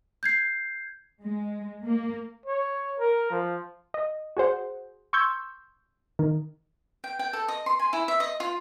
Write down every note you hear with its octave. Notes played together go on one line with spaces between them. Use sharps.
G6 G#6 C7
G#3
A#3
C#5
A#4
F3
D#5
F#4 G#4 C5 F#5
C6 C#6 E6 G6 G#6
D#3
G5
G5
A4
D#5
C6
G#5
E4
E5
D#5
F4